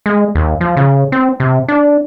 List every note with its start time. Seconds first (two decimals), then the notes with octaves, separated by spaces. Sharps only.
0.06 G#3
0.35 D#2
0.61 F3
0.77 C#3
1.12 C4
1.40 C3
1.68 D4